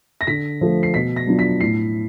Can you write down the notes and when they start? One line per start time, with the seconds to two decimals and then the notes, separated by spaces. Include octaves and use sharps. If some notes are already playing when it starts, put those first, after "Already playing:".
0.21 A#6
0.27 D3 B6
0.61 F3 A3
0.83 C7
0.94 B2 B6
1.16 A#6
1.27 F#3 B3 D4 F4
1.39 B6
1.60 A2 C7